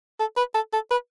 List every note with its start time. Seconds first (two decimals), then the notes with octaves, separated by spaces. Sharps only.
0.19 A4
0.37 B4
0.54 A4
0.73 A4
0.91 B4